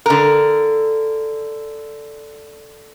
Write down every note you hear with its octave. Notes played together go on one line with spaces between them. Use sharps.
D3 A#4